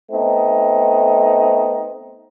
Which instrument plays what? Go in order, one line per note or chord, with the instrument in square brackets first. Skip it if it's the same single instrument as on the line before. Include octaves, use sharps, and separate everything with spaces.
[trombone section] A3 B3 C4 D#4